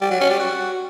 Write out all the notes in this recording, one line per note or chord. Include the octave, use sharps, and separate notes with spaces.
G3
F#3
C#4
G3
F#4